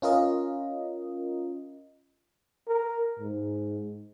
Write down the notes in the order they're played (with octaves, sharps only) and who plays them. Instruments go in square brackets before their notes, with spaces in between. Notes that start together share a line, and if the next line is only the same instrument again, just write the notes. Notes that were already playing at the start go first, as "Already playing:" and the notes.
[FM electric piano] C#4 F4 A#4 D#5
[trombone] A#4
G#2